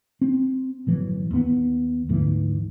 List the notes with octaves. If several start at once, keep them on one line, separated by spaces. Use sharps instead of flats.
C4
G1 A2 E3 F#3
D#2 B3
D2 G#2 D3 E3